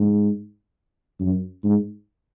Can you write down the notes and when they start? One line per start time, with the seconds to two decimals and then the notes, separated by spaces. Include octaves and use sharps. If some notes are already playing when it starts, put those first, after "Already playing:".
Already playing: G#2
1.20 F#2
1.64 G#2